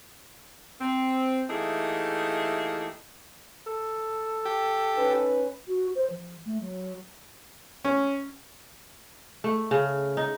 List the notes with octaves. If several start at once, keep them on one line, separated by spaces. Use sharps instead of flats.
C4
E3 A3 A#3 D#4 G4 G#4
A4
G4
C#4 D#4 B4
F#4
C5
F3
A3
F#3
C#4
A3
C#3
D#4